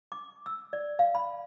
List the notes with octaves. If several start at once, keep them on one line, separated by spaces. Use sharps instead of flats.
D6
E6
D5
F5
B5